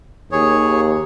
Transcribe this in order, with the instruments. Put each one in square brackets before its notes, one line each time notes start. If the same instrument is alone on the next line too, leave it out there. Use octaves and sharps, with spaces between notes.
[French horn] D#2 [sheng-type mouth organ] G#4 C#5